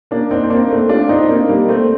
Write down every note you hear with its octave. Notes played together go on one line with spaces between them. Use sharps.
A#3 D4
C4 D#4
C4
A#3 D4
A3 C4
D4 F4
C4 D#4
A#3 D4
G3 A#3
A3 C4